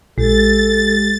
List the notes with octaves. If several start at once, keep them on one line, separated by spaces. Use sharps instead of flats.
A#1 G#3 G4 A4 A6